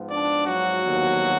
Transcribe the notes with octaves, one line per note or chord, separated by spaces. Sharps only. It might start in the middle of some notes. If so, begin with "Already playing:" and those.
Already playing: G#2 F3 B3
D4 D5
F#3 F#4
D#2 D3 F3 B3